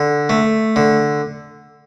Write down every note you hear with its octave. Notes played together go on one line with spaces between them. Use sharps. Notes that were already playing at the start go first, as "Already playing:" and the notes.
Already playing: D3
A3
D3